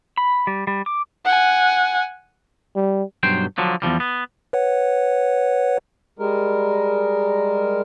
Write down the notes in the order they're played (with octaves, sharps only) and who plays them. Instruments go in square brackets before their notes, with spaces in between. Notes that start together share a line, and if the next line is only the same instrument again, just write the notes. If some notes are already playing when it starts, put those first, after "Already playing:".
[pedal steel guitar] B5
G3
G3
D6
[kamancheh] F#5 G#5
[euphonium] G3
[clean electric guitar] B1 G2 F#3 C5 G5
D3 F3 F#3
E2 G#2 F3 G3
B3
[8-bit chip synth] B4 C#5 F#5
[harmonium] G3 G#3 A#4